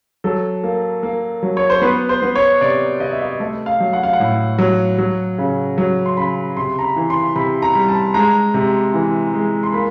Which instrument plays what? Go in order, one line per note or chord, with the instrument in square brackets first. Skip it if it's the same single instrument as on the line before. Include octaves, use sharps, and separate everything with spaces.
[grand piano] F#3 A4
A#3
A#3
F#3
C#5
C5
B3 B4
C5
B3
C#5
C3 D5
C3 D#5
E5
D#5
A3 D#5
F5
F#3
F#5
F5
F#5
A2
F#3
F#3
C#3
F#3
C6
C#3 B5
C3 C6
A#5
B5
E3
C6
C3 B5
A#5
G3
A5
G#3 A#5
C3
E3
G#3
C6
A#3 B5